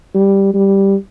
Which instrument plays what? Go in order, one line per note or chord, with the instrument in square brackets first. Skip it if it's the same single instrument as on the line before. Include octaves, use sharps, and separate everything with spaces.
[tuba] G3
G3